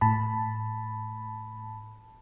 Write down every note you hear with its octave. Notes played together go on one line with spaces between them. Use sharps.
A2 A5 B5